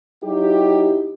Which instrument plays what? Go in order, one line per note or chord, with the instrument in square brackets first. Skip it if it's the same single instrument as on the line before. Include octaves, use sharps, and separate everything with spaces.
[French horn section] F#3 D#4 E4 G4